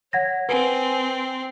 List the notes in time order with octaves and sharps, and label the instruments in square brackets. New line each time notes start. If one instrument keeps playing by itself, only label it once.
[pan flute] C#5 [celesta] F#5 G#6 A#6
[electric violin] C4 [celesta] B4 [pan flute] G#5